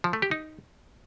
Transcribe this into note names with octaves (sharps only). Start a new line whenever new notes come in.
F3
A3
G4
D#4